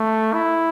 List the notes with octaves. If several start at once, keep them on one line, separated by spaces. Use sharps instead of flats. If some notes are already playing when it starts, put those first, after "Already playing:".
Already playing: A3
E4